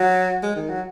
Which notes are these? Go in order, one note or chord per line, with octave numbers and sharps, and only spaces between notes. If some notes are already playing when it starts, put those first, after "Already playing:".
Already playing: F#3
G#3
D#3
F#3